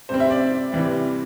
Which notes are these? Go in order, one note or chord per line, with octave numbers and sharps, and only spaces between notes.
C3 G3 C4 C5
E5
D5
C3 E3 G3